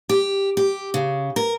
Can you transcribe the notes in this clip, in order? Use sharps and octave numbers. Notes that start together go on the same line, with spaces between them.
G4
G4
C#3
A#4